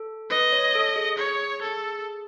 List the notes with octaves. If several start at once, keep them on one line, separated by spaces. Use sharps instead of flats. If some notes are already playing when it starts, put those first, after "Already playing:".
Already playing: A4
B4 D#5
C#5
A4
G#4
G#4 C#5
A4